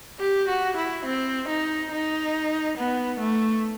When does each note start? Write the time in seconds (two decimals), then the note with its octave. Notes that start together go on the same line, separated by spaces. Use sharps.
0.20 G4
0.48 F#4
0.77 E4
1.05 C4
1.49 D#4
1.92 D#4
2.78 B3
3.20 A3